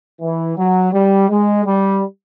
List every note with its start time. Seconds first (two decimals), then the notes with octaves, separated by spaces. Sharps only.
0.21 E3
0.57 F#3
0.93 G3
1.29 G#3
1.65 G3